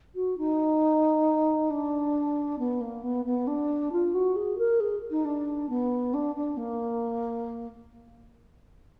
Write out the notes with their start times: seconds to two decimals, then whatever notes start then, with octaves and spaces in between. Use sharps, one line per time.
0.14 F#4
0.37 D#4
1.70 D4
2.58 B3
2.81 A#3
3.03 B3
3.25 B3
3.47 D4
3.92 F4
4.14 F#4
4.35 G#4
4.58 A#4
4.80 G#4
5.10 D#4
5.24 D4
5.69 B3
6.13 D4
6.35 D4
6.57 A#3